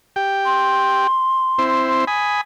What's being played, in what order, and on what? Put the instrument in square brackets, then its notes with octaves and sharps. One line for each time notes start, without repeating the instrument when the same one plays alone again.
[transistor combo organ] G4 G5
[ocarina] C6
[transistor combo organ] C4 E4 C5
G#5 B5 D#6